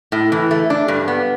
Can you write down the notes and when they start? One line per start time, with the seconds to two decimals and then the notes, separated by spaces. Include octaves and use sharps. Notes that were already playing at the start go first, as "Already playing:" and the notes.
0.12 A2
0.32 E3
0.51 A3
0.70 D4
0.88 G2
1.08 B3